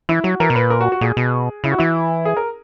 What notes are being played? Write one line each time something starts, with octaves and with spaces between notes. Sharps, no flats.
E3 E4
F#3 F#4
E3 A#4
B2
A#2 B4
A#4
F#4
F#4
A#2 G#4
B2
C#3 E4
F#4
E3 E4
G#4
A#4